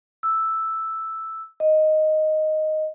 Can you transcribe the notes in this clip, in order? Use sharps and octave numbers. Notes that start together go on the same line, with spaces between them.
E6
D#5